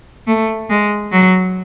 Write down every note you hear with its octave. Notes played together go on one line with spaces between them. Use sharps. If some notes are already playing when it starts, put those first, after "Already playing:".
A3
G#3
F#3